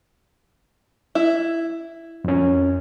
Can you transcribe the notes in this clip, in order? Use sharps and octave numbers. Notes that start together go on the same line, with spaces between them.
E4
F2 C#4